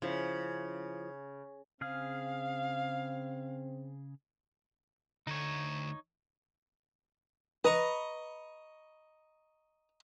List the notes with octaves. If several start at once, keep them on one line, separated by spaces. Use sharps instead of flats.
C#3 F3 E4 C5
C#3 C4 G#4 F5 F6
D2 A3 D#4 C#5
B4 D#5 A#5 C#6